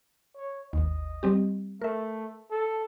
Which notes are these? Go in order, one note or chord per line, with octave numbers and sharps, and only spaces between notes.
C#5
G#1 D#2 D#5
G3 C4 G4
A3 A#4 E5
A4